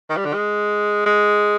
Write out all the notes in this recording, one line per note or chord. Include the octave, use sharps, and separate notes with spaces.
D#3
G3
D3
G#3
G#3